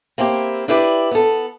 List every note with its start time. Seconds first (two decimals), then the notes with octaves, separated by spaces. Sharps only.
0.18 A#3 C4 E4 G4
0.68 D4 E4 G4 B4 C5 D5
1.11 B3 A4